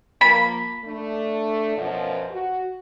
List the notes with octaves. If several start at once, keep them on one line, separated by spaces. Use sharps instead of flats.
F3 A#3 B5
A3 D4
F#2 B2 F3
F#4